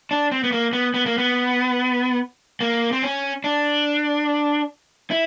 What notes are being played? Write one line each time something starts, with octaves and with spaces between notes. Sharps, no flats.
D4
C4
B3
A#3
B3
B3
A#3
B3
A#3
C4
C#4
D4
E4